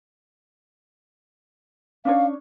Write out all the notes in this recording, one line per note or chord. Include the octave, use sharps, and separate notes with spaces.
C#4 D4 C#5 F5